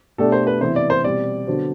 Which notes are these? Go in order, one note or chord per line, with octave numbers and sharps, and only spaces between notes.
B2 A3 D4 G4 A4 D5
C5
B4
C3 E3 B3 E4 C5
D5
C5
B2 G3 C4 D5
D3 F#3 B3 F#4 C5